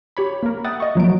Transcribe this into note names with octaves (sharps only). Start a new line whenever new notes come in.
G4 C#5 B5
A#3 A#4
E5 F#5 G5 D#6 A6
D#5 C#6
F3 F#3 A#3 D7